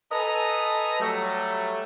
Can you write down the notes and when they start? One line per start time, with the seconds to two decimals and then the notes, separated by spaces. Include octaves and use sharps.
0.12 A4 B4 D#5 G#5 A#5
1.00 F#3 G3 A3